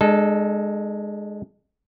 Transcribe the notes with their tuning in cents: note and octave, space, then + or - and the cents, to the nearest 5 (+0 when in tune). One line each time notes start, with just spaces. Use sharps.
G#3 +0 D4 +40 A4 -15